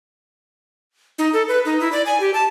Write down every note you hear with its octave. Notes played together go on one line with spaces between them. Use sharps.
D#4
A4
B4
D#4
E4
D5
G#5
G4
A5